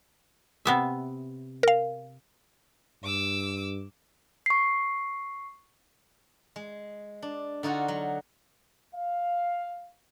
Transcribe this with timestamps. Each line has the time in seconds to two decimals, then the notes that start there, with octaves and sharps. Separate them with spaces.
0.65 C3 B3 E5
1.63 A#4 F5
3.04 G2 D6 E6
4.46 C#6 C7
6.56 G#3
7.22 D4
7.63 D3 D#4 F4 F#4
7.88 F#3
8.94 F5